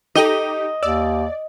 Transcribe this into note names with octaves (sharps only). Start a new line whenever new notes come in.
D#4 G4 A4 D#5 G5 D#7
D#2 D5 E6